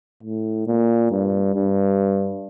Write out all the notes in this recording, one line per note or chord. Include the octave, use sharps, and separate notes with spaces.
A2
A#2
G2
G2